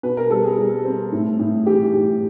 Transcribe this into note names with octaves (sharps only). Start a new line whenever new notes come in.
B2 B4
A#4
G3 A4
G#4
G3
C4
A2
A2
E3 G4
A2